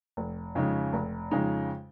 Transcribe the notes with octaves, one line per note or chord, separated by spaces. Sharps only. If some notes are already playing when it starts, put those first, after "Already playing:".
F1
F2 C#3 G#3 D#4
F1
F2 C#3 G#3 D#4